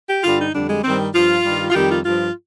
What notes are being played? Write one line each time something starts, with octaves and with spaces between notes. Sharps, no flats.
G4
G2 D3 G3 F4
D#4
F2 D3 G3 D4
G#3
G2 D#3 G3 C4
G2 F3 F4
G2 D#3 G3
F4
F2 D#3 G3 G4
F4
G2 F3 F4